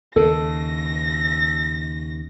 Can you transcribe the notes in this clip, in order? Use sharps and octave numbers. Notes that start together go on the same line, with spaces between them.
D#2 C#3 A4 A#6